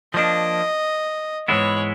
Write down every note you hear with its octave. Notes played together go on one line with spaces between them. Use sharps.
F3 A#3 D4 D#5
G#2 E3 G#3 B3 E4 C#5